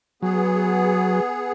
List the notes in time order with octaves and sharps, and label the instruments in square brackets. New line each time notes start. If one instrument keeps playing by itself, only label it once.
[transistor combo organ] F#3 [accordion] B3 G#4